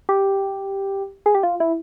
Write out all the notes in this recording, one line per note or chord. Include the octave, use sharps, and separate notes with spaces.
G4
G#4
G4
F4
E4